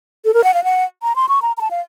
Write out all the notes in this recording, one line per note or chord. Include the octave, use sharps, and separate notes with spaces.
A4
A#4
F#5
F5
F#5
A#5
C6
C#6
A#5
A#5
A5
F5